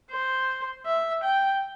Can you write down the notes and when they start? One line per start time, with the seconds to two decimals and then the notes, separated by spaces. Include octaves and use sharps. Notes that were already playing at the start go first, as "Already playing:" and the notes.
0.11 C5
0.85 E5
1.23 G5